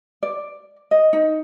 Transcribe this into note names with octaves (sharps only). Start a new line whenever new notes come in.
D5
D#5
D#4